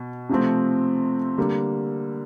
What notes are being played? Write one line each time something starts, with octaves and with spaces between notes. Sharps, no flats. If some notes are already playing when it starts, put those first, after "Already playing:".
Already playing: B2
C3 F3 A3 C4
D3 G3 A#3